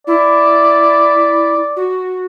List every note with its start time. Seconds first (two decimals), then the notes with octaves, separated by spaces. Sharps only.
0.07 E4 D5
1.76 F#4